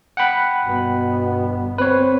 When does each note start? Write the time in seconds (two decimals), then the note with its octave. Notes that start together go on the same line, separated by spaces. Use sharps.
0.17 F#5 G5 B5
0.66 G1 B2 B3
1.78 C4 B4 C#5